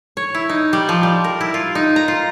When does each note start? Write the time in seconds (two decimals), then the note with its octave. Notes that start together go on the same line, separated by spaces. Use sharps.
0.17 C#5
0.34 E4
0.49 D#4
0.73 G3
0.89 F3
1.03 G3
1.24 A#4
1.41 E4
1.54 F4
1.75 D#4
1.96 A#5
2.08 F4